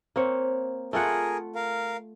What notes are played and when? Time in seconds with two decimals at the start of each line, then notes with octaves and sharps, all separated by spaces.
0.16 A#3 C4 C#5
0.93 A3 F4 G#4 A#4 F#5
1.55 A#4 F5